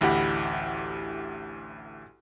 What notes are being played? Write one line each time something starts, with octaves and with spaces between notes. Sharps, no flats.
A1 D2 E4 G4 F#5 B5